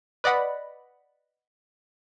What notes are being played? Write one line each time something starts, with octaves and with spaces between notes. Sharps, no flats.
B4 D5 D#5 F#5 B5